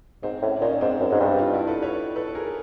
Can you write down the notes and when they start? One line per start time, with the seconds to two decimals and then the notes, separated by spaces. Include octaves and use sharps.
0.23 G#2 C4
0.42 A2 C#4
0.56 D4
0.61 A#2 C#4 D#4
0.72 D#4
0.81 G#2 C4 D4
1.00 F#2
1.10 G#2 C#4 D#4
1.20 G2
1.39 D#4 F4
1.53 E4 F#4
1.67 A4 B4
1.82 B4 C#5
2.16 A4 B4
2.27 A4
2.35 G#4 A#4